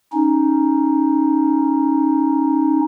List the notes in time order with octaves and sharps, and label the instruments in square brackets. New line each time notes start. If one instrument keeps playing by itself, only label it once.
[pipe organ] C#4 D#4